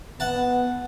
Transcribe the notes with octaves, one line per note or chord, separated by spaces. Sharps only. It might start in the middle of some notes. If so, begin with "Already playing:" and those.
B3 F#5 A5